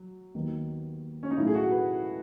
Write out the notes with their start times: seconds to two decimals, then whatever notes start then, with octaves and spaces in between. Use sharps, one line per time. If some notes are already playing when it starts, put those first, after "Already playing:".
Already playing: F#3
0.34 D#2 D#3 F#3 B3
1.23 C#4
1.31 D#4
1.37 A2 F#3 A3 E4
1.47 G#4
1.55 F#4
1.71 B4